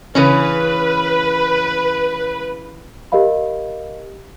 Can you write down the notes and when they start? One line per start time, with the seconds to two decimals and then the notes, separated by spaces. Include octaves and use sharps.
0.15 C#3 E3 C#4 B4
3.12 G4 A#4 D#5 F5 B5